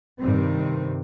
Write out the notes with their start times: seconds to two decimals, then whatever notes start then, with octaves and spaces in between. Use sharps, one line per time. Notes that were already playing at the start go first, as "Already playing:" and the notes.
0.21 G2 C3 D#3 G3 C4